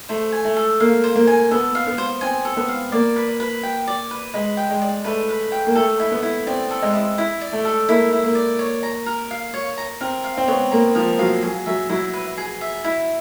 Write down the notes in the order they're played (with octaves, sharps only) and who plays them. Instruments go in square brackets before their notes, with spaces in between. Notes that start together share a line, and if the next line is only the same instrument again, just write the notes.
[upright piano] A3 [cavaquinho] C5
[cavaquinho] G#5
[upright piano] A3
[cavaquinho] A4
[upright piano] A#3 [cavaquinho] F5
[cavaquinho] C5
[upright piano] A#3
[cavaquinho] G#5
[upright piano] B3 [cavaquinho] A4
[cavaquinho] F5
[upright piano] B3
[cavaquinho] C5
[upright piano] C4 [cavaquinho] G#5
[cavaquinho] A4
[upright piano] B3
[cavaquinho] F5
[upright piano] A#3 [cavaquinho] D5
[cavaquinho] B4
B4
G5
D5
B4
[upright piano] G#3 [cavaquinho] B4
[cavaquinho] G5
[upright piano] G#3
[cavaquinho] D5
[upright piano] A3 [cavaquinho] B4
[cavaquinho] B4
G5
[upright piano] A#3
[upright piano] A3 [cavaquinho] A4
[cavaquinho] E4
[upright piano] B3
[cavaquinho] E4
[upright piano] C4 [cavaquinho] D5
[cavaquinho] A4
[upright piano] G#3
[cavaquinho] E4
E4
D5
[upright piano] A3
[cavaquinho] A4
[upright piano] A#3 [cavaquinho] E4
[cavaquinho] E4
[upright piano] A#3
[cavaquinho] D5
C#5
A#5
A#4
F5
C#5
A#5
[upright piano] C4 [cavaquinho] A#4
[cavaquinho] F5
[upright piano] C4
[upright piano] B3 [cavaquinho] C#5
[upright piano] A#3 [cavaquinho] A#5
[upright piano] F3 [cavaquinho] A#4
[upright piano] F#3 [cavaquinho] F5
[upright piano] F#3 [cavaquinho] G#4
[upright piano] F#3 [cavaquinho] E5
[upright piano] F#3 [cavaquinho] E4
[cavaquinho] B4
G#4
E5
E4